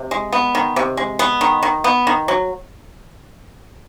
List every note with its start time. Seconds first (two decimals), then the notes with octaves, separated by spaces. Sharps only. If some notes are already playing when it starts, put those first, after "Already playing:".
Already playing: C3
0.11 G#3
0.33 B3
0.55 D#3
0.76 C3
0.97 G#3
1.19 B3
1.41 D#3
1.62 D#3
1.84 B3
2.07 D#3
2.28 F#3